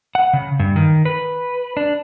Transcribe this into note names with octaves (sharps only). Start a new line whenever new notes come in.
F#5
C#3
G2
D#3
B4
D4